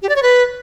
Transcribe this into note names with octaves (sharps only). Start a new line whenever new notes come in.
G4
D5
C#5
B4